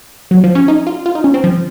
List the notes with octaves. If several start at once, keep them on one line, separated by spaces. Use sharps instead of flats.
F#3
F3
C#4
D#4
F4
F4
D#4
C#4
C4
F3